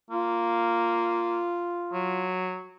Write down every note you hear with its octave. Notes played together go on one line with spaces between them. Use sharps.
A#3 F4
F#3